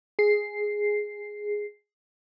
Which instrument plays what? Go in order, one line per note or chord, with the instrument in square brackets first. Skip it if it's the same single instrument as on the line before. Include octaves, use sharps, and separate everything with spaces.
[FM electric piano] G#4 C7